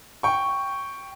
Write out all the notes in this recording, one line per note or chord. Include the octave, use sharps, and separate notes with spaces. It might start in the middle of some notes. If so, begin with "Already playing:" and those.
G5 C#6